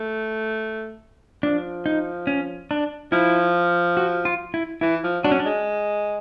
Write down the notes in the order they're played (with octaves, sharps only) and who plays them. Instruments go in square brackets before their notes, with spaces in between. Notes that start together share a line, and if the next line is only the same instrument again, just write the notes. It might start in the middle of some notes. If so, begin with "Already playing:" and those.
Already playing: [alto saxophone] A3
[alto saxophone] F3 [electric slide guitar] D4
[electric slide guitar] D#4
C#4
D4
[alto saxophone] F3 [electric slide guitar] E4
[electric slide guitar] F#4
F4
E4
[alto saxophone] E3 [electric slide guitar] E4
[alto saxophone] F3
[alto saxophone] F#3 [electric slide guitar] D4
[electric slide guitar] C#4
D4
[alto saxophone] G#3